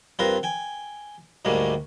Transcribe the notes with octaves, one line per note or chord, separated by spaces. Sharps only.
G2 C4 F4 A#4 B4
G5 G#5
D2 G#2 G3 A3 A#3